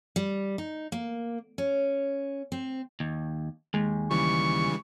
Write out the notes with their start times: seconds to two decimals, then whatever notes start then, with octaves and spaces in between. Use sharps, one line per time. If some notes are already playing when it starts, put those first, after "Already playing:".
0.16 G3
0.58 D#4
0.92 A#3
1.58 C#4
2.52 C4
3.00 D#2
3.74 D#2 G#3
4.11 C#3 E3 G3 C#6